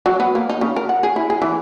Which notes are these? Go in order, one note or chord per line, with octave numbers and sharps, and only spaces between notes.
F#3
B3
A#3
D#4
C#3
A#4
F#5
G#4
E4
G#4
E3